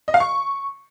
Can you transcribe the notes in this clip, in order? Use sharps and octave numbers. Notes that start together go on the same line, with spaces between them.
D#5
F5
C#6